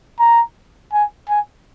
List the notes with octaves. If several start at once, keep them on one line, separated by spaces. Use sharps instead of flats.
A#5
G#5
G#5